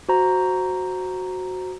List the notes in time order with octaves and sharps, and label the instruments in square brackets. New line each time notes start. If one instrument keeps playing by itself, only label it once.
[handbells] F#4 C5 A#5